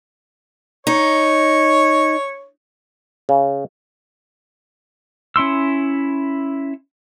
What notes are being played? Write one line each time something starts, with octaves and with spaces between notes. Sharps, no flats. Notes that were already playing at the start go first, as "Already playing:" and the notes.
D#4 C#5
C#3
C#4 E4 C6 E6